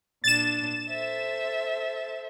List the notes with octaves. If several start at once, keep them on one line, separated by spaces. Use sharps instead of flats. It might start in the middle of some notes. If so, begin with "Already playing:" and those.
A#2 D4 A6 E7
A4 C5 E5